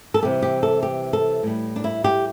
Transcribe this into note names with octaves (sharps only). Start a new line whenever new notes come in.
A4
C3 E3 G3 G4
G4
A4
G4
A4
A2 G3
D4
E4
G4